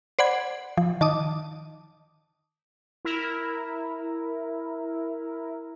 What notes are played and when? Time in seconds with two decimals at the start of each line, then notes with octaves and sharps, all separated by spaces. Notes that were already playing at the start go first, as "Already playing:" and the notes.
0.19 C5 D5 F#5 B5 G#6
0.77 F3
1.01 D#3 A5 D6 D#6
3.05 E4 A#4